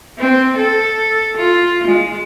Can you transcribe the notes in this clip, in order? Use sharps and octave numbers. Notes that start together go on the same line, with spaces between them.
C4
A4
F4
G#3